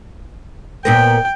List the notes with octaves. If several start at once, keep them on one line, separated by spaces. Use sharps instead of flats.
A#2 B3 A#4 G5